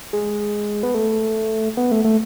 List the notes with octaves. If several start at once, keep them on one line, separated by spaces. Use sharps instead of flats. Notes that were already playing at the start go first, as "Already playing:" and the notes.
G#3
B3
A3
B3
A3
A3